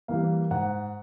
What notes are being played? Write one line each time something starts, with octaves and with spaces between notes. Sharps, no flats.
E3 G3 A#3 F5
G#2 F#5